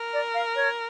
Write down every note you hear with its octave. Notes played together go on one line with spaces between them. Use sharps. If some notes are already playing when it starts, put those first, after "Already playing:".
Already playing: A#4
D5
F5
C#5